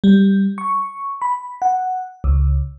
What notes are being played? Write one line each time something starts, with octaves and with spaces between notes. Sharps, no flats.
G3
C#6
B5
F#5
C#2